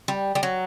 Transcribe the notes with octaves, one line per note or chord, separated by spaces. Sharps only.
G3
G3
F#3